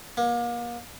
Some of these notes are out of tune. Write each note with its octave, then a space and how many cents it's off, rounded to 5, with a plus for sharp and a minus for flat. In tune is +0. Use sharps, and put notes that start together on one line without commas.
A#3 +35